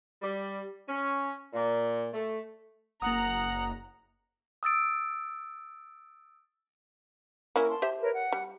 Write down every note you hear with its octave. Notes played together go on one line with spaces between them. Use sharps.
G3
C#4
A#2
A3
F#1 A#3 F#5 A#5 D#6
D#6 E6 A6 D7
A#3 C#4 E4 A#4
A5 C6
G4 C5 E5
A#4 B4 C#5
F#5
G3